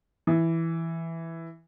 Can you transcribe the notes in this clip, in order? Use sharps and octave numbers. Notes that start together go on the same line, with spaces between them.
E3